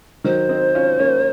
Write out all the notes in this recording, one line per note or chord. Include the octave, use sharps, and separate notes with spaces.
D#3 F#3 C5
C4 D#4
C#4 F4
A#3 C#4